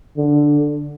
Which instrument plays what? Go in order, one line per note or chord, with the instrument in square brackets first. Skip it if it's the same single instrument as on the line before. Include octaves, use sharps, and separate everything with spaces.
[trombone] D3